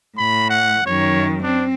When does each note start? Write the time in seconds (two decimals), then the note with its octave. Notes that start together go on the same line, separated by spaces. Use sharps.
0.18 A2 B5
0.50 F#5
0.86 F#2 D#3 C#5
1.43 C4 D4